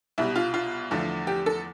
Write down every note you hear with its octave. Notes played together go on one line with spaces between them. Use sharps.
C2 B2 G3 E4
F4
F4
E2 D3 F3 A3
G4
A4